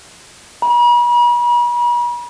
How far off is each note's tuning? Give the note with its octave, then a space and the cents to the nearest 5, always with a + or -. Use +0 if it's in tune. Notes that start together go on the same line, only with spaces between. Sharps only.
B5 -45